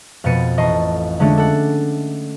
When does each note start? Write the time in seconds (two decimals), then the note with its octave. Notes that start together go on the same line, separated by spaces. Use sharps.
0.24 F2 B2 B3 A6 C#7 D#7
0.57 A1 D#5 A5 C#6 C7
1.20 D3 G#3 A3 C#4 D4
1.38 A4 F#5